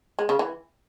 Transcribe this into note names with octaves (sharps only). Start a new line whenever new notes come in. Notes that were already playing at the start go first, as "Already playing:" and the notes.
G#3
C#3
E3